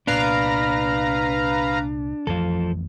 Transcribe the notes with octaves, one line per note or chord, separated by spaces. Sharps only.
C2 A#2 B3 D4 B4 F5 A#5
A1 F2 E3 F3 A4